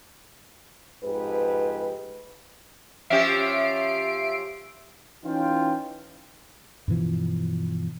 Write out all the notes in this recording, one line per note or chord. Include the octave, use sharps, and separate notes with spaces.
F2 G#2 G4 B4
F3 C#4 G4 E5 C7 D7
E3 C#4 D#4 F4 G5
G2 B2 E3 F3